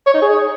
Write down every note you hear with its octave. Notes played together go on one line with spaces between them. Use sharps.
C#5
D#4
G#4